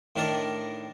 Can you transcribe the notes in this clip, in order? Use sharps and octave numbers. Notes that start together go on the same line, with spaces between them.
A2 D#3 D4 A#4 D5